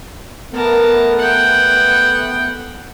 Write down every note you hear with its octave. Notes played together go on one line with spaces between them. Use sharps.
A3 B3 A#4 A5
F#5 G5